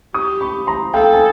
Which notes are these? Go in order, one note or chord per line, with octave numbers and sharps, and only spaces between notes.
G4 C#6 D#6
B5 C#6
A#5 C6
A4 F5 G5
G#5